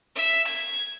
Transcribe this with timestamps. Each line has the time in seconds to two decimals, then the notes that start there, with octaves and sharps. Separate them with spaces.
0.15 E5
0.47 G#6